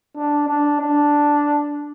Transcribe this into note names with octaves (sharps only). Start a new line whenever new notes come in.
D4
D4
D4